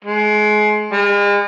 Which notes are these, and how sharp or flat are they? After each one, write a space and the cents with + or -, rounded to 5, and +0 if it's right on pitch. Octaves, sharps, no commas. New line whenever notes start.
G#3 +25
G#3 -40